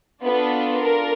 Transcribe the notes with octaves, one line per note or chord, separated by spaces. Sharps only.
B3 D4 F4 A4 B4
A#4